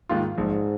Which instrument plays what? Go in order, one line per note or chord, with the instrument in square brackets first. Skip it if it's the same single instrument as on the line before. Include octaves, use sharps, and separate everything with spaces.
[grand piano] G#2 D#3 A#3 F4
[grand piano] A#1 [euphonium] G#2